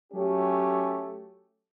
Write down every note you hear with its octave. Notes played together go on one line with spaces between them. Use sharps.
F#3 A3 C#4 G4